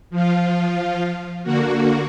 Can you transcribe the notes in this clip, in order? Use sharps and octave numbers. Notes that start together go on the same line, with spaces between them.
F3 F4
D3 A#3 F#4